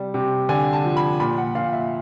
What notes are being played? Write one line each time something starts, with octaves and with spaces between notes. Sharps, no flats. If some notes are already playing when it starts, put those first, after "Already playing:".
Already playing: C3 G3
C3
D3 G#5
A5
F3
B5
A#2 B5
F#5
A#2 F5
E5